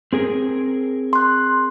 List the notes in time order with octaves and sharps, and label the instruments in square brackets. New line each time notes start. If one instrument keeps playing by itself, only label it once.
[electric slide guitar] C4 G#4 A#4
[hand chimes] C6 F#6